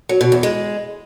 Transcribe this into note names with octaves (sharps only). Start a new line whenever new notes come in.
F#3
B2
E2
G#3